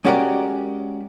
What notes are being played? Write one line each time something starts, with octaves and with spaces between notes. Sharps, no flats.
G#3 C#4 F#4 G4 A#4 D5